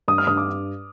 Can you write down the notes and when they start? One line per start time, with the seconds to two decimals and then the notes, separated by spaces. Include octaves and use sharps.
0.08 G2 D#6
0.18 F6
0.27 G2 D#6
0.37 D6